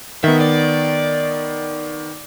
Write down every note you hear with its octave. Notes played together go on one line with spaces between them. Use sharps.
D#3 B3 E5
D5